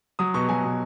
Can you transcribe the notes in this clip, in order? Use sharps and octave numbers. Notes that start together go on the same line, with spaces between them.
F#3 D#6
B2 C#6
F#3 G#5
B2